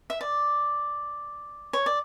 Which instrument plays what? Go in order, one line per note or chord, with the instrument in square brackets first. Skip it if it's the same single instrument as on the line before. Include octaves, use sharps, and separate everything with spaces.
[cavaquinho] E5
D5
C#5
D5